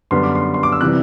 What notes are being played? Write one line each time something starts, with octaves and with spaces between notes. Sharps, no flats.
F#2 D3 G3 B3 C6
D6
C6
C6
D6
E6
C3 E3 G3 F#6